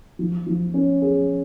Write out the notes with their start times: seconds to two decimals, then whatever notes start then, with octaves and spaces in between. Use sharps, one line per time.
0.19 F3
0.47 F3
0.74 C#4
1.02 G#4